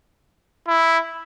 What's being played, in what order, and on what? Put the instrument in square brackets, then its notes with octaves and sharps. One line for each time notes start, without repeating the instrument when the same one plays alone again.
[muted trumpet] E4